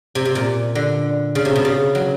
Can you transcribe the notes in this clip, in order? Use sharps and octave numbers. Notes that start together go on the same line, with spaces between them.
C3
C3
A#2
D3
C#3
C3
B2
C#3
F#3